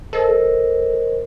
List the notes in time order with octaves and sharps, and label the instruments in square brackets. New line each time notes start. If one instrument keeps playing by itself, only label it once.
[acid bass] A4 [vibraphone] A#4 C5 D#5